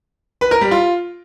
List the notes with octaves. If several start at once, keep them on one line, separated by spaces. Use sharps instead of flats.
B4
A#4
G3
F4